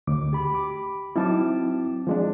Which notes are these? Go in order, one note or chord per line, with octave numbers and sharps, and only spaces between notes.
D2 D6
G4 B5
D6
F#3 C4 D#4 E4 A5 D6
F3 G#3 D4